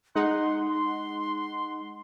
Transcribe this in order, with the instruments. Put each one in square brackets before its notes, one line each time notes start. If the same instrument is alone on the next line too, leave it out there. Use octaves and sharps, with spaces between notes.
[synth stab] G#3 D#4 F#5 [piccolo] C6
[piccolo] C6